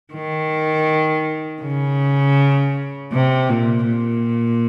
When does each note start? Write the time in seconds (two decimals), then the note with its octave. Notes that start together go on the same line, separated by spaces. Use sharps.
0.13 D#3
1.62 C#3
3.12 C3
3.49 A#2
3.86 A#2